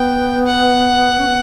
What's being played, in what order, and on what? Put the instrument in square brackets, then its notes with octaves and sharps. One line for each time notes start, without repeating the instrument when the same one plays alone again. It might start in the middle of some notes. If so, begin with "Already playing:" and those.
Already playing: [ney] B3 [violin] G5
[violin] F#5
[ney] C#4
B3